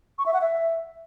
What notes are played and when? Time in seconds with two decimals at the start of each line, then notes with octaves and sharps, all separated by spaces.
0.18 C#6
0.26 E5
0.34 F#5
0.41 E5